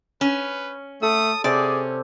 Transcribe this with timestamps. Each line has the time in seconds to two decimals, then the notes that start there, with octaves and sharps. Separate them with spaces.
0.21 C#4 B4
1.02 A3 A4 D#6
1.44 C3 C#4 G#4 D5